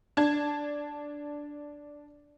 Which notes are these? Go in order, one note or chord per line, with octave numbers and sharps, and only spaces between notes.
D4 A5 G#6